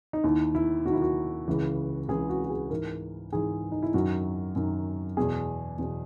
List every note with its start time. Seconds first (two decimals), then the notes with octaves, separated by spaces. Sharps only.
0.13 D#4
0.24 D#2 D#3 E4
0.55 E4
0.85 D#2 D#3 F#4
0.93 E4
1.02 F#4
1.48 C#2 C#3 E3
2.08 C#2 C#3 E3 G#4
2.29 F#4
2.45 F#4
2.50 G#4
2.70 G#2 E3 A#4
3.32 G#2 E3 G#4
3.72 D#4
3.83 E4
3.94 F#2 D#3 F#4
4.56 F#2 D#3
5.17 E2 B2 G#4
5.79 E2 B2